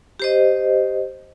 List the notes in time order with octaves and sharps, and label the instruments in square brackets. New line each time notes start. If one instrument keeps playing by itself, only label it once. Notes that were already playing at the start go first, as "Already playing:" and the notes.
[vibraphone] G4 C5 D#5